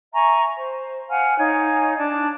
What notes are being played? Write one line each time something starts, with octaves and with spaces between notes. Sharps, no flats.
E5 G#5 A#5 C#6
C5
F5 F#5 G#5 F6
D#4 C#5 F5 G#5
D4 D5 A5